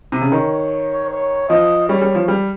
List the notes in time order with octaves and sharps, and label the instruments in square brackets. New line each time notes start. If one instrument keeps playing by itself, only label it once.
[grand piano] C3
C#3
[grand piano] D#3 [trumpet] C#5
[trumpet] C#5
[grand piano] F3 [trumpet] D#5
[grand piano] G3 [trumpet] C#5
[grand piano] G3
F3
G3